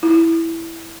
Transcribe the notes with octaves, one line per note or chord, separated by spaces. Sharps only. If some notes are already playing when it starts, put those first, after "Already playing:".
E4